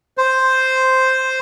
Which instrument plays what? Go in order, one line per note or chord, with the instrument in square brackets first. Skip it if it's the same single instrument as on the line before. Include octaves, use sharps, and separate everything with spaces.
[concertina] C5